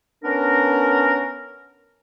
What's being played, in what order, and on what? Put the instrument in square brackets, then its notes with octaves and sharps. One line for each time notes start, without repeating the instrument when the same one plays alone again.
[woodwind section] B3 C#4 D4 A#4